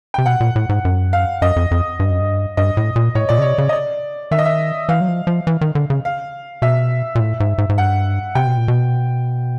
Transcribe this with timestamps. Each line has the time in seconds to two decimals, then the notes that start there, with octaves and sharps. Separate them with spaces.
0.14 C3 G5
0.26 B2 F#5
0.40 A#2
0.56 A2
0.69 G#2
0.85 F#2
1.13 F5
1.42 F#2 D#5
1.56 F2
1.71 F2
2.00 G2
2.10 F#2
2.21 G2
2.57 G2 D#5
2.77 A2
2.96 A#2
3.15 A2 C#5
3.29 A#2 D5
3.38 C#3
3.42 C3 C#5
3.58 C#3
3.69 D#5
3.73 D5
4.31 D#3 E5
4.39 D#5
4.46 E5
4.89 E3 F5
5.01 F#3
5.08 F3
5.27 F3
5.47 E3
5.61 D#3
5.75 D3
5.90 C#3
6.05 F5
6.62 B2 E5
7.15 A#2
7.20 A2
7.40 G#2
7.58 G#2
7.69 G#2
7.78 G2 F#5
8.35 C3 G5
8.47 B2
8.57 A#2
8.68 B2